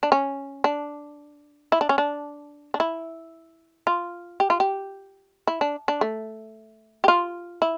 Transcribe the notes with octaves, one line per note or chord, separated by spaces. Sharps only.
D4
C#4
D4
E4
D4
C#4
D4
D4
E4
F4
G4
F4
G4
E4
D4
D4
A3
G4
F4
E4